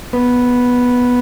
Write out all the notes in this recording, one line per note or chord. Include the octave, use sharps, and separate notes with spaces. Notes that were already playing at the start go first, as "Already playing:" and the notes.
B3 B4